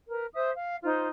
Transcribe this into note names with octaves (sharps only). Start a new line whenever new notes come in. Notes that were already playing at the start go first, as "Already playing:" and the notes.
A#4 B4
C5 E5 D#6
F5
D#4 F4 C5